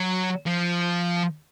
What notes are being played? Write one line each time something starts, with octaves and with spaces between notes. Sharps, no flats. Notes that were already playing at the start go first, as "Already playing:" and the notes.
Already playing: F#3
F3